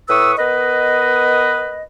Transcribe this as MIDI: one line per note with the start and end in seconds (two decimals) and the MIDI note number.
0.09 0.32 45
0.09 0.32 71
0.09 0.32 85
0.09 0.32 87
0.09 0.32 88
0.38 1.84 59
0.38 1.84 70
0.38 1.84 71
0.38 1.84 75